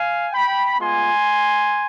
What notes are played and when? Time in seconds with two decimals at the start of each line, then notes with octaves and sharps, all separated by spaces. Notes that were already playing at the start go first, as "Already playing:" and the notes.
Already playing: F5 G#5
0.32 G5 B5
0.79 G#3 B3 F4 G#5 C6